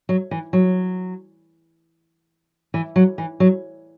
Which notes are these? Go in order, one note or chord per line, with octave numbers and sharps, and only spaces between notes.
F#3
E3
F#3
E3
F#3
E3
F#3